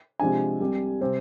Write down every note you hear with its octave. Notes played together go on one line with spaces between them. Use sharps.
C3 F3 G#3 D4 G#5
C2 C3 G3
C3 G3 C4